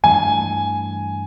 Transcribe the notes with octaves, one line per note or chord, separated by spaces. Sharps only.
G2 E3 A3 G#5